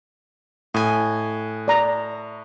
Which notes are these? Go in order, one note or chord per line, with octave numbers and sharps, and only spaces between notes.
A2 D#5 G#5
D5 A#5